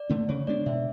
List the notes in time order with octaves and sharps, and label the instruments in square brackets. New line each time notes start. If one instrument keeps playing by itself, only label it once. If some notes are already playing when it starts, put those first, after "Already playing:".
Already playing: [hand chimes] D5
[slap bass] D3 A3 C#4
[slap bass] C#3 [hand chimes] C#5
[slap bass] G#3 B3 D4 [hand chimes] D5
[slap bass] B2 [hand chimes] E5